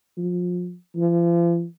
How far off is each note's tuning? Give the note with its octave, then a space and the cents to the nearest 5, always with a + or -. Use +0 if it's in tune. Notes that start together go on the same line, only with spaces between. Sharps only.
F3 +30
F3 -40